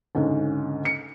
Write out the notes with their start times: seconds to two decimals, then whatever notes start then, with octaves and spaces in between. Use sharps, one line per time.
0.15 D2 G#2 C#3
0.85 C#7